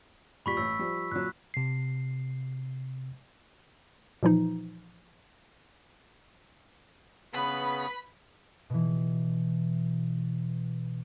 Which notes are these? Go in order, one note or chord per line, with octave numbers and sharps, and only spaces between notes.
A#2 G3 B5 C#6 B6
A1 E6
F3 G3
A#2 F#3 F#6
C3 C7
A#2 E3 F3 D#4
C#3 B3 B4 B5
B2 E3